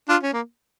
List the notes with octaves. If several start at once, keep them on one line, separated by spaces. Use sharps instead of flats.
D4 F4
C#4
A#3